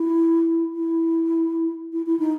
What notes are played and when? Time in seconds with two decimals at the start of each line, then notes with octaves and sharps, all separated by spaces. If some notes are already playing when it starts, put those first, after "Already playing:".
Already playing: E4
0.74 E4
1.93 E4
2.06 E4
2.19 D#4